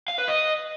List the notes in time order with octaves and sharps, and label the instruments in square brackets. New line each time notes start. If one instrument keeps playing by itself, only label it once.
[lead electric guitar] F5
B4
D#5